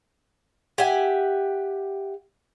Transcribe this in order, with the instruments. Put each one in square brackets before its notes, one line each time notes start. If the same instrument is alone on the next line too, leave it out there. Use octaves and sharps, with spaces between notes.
[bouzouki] G4 E5 F#5 G#5